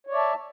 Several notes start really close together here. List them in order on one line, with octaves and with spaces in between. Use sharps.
C#5 D5 E5 A5